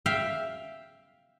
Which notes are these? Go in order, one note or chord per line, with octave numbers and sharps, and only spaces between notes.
E5 F5 G5